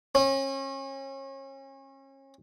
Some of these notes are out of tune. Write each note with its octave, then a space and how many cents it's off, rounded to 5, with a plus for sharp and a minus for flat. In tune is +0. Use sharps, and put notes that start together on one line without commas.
C#4 -35